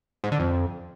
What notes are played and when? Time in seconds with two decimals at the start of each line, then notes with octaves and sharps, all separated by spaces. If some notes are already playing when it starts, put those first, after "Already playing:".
0.24 G#2
0.32 D3
0.40 F2